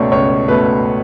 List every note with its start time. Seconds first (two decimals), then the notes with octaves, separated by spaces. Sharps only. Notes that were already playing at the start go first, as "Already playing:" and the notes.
Already playing: C#2 B2 A3 C#5 D5
0.12 C#2 C#5
0.48 B2 A3 B4